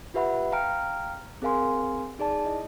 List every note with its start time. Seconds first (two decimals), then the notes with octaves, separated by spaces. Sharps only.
0.14 F4 G4 B4 E5 F#5 B5
0.52 F5 G5 A#5 F6 D7
1.42 C4 G#4 A#4 F5 G#5 C6
2.19 D#4 G#4 D5 A5
2.45 E4 D#5